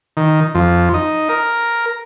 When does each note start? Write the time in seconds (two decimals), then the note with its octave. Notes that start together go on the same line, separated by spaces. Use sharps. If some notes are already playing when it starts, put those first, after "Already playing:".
0.17 D#3
0.55 F2
0.94 D#4
1.29 A#4